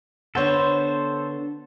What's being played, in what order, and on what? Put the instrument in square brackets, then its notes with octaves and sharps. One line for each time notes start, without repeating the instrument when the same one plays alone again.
[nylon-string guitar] D3 D4 [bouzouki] B3 C#5 [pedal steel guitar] A4 C5